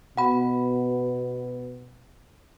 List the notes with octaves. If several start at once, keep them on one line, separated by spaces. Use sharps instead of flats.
B2 F#5 B5